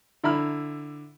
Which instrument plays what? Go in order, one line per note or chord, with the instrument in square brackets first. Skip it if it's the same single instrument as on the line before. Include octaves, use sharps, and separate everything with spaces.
[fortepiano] D3 E4 A#5 B5 F6